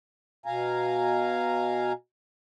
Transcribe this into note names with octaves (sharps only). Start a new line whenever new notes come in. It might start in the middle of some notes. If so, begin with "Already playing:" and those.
B2 F5 G#5 A#5